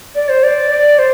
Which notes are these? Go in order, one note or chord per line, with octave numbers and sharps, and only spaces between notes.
D5
C5
D5
D5
C5